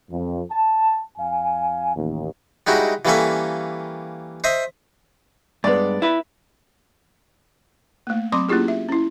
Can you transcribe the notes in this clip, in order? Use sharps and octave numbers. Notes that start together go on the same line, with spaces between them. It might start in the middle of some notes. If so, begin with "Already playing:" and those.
F2
A5
F2 F5 G#5
A1 D#2
G3 G#3 D#4 E4 F#4
E3 G3 A#3 C#4 A4 E5
C5 D#5 E5
G2 G#3 B3 D5
E4 B4
A3 A#3
F#3 C4 B5 C6 D6
A#3 C#4 E4 F4 G4 G#4
E5
C#4 E4